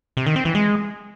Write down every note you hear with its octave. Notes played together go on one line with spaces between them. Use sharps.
C3
D#3
C4
E3
G#3